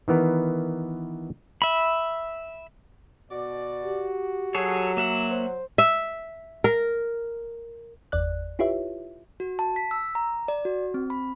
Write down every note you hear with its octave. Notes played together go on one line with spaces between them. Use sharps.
D#3 E3 B3 A#4
E5 B5
B2 F#4 D5
G4
F#3 G#4 A4 C#5
A#3 E5 F#5
C5
E5
A#4
G1 E2 D5 F#6
E4 F4 G4 B4 C#5 E5
F#4
A5
B6
E6
A#5
D5
F#4
C4
B5